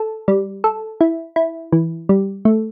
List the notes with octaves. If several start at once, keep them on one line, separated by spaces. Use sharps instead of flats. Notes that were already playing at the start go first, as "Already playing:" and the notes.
Already playing: A4
G3
A4
E4
E4
E3
G3
A3